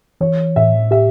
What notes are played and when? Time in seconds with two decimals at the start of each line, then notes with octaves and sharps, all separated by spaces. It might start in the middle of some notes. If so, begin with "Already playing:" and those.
0.21 E3 C#5
0.56 A2 E5
0.91 G4 E5